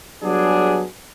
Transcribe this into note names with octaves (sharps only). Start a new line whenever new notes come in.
F#3 G3 B3 D4 G#4